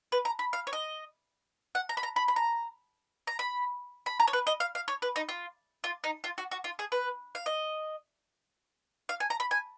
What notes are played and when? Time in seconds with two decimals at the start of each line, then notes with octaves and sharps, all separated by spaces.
0.12 B4
0.25 A#5
0.39 B5
0.53 F5
0.67 C#5
0.73 D#5
1.75 F#5
1.89 A#5
1.97 B5
2.03 A#5
2.16 B5
2.28 B5
2.36 A#5
3.27 A#5
3.39 B5
4.06 B5
4.20 A#5
4.28 C#5
4.33 B4
4.47 D#5
4.60 F5
4.75 F5
4.88 C#5
5.02 B4
5.16 D#4
5.29 F4
5.84 F4
6.04 D#4
6.24 F4
6.38 F#4
6.51 F#4
6.64 F4
6.79 G#4
6.92 B4
7.35 F5
7.46 D#5
9.09 F5
9.20 G#5
9.30 A#5
9.40 B5
9.51 G#5